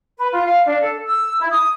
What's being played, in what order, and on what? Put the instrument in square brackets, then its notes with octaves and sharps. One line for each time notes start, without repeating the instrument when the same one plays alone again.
[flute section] B4
F4
F5
D4
A4
E6
E4
D#6